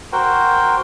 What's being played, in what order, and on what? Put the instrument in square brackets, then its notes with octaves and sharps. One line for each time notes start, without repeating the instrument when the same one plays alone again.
[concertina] F#4 A#4 C5 G5